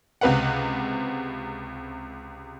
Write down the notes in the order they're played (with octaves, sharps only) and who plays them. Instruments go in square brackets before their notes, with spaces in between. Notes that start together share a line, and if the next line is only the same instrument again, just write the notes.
[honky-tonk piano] C#2 C3 B4 F5 F#5